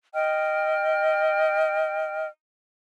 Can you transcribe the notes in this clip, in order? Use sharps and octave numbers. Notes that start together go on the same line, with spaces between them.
D#5 G5 F6